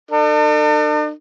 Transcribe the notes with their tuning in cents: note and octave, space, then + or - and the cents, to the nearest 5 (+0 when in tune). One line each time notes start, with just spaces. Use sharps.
D4 +45 A4 +40